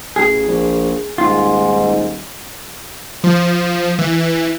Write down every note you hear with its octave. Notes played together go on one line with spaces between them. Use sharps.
A1 G#4
A#1
D#1 G#2 F4
F3
E3